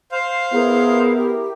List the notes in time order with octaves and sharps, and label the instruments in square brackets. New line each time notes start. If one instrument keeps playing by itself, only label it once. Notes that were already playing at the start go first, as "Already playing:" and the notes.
[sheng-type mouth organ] C5 F5
[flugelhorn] B3 [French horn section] E4 A#4 [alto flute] G#4
[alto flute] G4